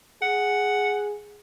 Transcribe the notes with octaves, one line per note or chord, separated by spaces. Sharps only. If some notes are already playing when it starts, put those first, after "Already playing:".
G#4 F#5